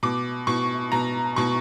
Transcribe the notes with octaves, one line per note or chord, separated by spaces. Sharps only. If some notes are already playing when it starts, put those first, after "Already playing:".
B2 D6
B2 C#6
B2 A#5
B2 C#6